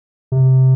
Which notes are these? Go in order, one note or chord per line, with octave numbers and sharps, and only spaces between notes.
C3